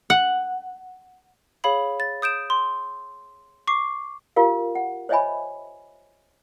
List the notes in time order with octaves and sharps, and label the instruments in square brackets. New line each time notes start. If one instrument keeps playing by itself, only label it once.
[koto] F#5
[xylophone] G#4 C#5 F5 B5 F#7
A6
D#6 G6 D7 E7
C6
C#6 D6 C7
[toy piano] F4 G4 A#4 F5
F#5
C5 C#5 D#5 E5 G#5 B5